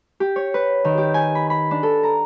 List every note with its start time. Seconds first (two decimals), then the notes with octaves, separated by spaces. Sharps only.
0.20 G4
0.36 C#5
0.54 B4
0.84 D#3
0.98 G4
1.14 G#5
1.35 B5
1.50 B5
1.71 D4
1.83 A4
2.03 A#5